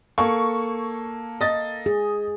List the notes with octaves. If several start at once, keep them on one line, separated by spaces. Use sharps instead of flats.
A#3 A4 C#6
D#5 A6
G#4